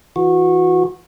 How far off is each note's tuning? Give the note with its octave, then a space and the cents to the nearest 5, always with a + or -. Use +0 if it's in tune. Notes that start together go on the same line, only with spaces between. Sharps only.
E3 +5 F#4 -20